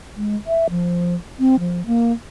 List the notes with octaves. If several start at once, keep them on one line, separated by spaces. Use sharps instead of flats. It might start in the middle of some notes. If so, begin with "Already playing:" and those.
G#3
E5
F3
C4
F3
A#3